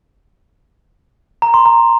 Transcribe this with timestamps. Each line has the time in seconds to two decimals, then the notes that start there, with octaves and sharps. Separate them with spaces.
1.42 A#5
1.54 C6
1.66 A#5